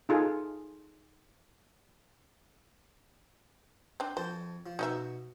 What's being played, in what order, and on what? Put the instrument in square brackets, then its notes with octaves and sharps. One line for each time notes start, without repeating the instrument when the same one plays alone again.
[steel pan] D#4 F4 G#4 A4
[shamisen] C4 D4
[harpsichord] F2 A5 [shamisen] C5
[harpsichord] F3
[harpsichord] B2 [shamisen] D#4 D#5 E5